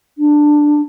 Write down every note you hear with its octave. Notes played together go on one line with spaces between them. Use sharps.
D4